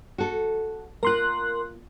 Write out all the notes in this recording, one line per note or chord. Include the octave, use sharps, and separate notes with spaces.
F#4 A4
A#3 F4 A#4 C6 F#6